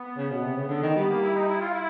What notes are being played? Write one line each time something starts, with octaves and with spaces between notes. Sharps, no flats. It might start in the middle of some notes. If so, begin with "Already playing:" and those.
Already playing: B3
C#3
B2
C3
C#3
D3
D#3
G3 B3
A#3
E4
D#4
E4
F4
E4